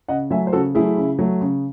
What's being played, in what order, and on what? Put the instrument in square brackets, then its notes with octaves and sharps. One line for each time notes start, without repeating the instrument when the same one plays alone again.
[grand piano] C#3 D#5 F#5
F#3 A3 E5 G#5
C5
C#3 F#4 A4
F#3 A3 E4 G#4
C#3
F#3 A3
C#3